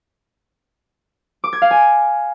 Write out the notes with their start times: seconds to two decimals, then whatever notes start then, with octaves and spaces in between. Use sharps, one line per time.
1.44 D6
1.53 G#6
1.62 F5
1.71 G#5